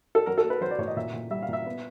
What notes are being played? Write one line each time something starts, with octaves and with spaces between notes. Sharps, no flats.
A4
F#3 A#4
A4
A#3
B4
F#3 C5
D5
A2 C#5
D#5
A#2 E5
A#2
G3 E5
F5
A#2 E5
B3